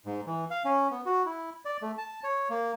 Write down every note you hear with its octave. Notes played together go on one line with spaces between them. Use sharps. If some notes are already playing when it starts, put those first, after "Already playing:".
G#2
E3
F5
C#4
B3
F#4
E4
D5
A3
A5
C#5
A#3